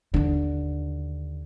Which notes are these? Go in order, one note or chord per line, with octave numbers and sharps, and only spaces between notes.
D#2 D3